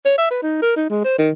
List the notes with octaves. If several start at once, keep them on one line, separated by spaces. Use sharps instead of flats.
C#5
E5
B4
D#4
A#4
D#4
G#3
C5
D#3